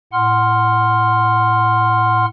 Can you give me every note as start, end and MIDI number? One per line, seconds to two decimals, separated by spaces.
0.13 2.25 45
0.13 2.25 78
0.13 2.25 84
0.13 2.25 89